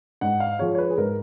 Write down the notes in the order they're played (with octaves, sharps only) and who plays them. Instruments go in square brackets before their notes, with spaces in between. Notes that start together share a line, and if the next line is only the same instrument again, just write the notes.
[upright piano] G#2 F#5
F5
F3 G#3 C#5
C#5
B4
G#4
G#2 A#4